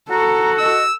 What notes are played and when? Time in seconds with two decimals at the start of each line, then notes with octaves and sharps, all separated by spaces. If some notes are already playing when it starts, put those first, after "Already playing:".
0.10 F#4 A4 A#5
0.59 D#5 E6